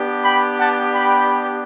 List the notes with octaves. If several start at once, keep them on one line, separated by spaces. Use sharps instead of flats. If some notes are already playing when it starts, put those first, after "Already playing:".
Already playing: B3 D4 G4
G5 B5
F#5 A5
G5 B5